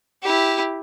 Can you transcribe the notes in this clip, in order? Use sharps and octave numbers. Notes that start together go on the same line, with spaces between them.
E4 G4